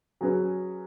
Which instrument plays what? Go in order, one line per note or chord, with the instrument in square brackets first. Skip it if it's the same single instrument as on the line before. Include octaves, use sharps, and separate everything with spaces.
[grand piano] F#3 C#4 G#4 B4